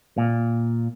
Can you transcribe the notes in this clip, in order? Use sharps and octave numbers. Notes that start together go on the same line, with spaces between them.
A#2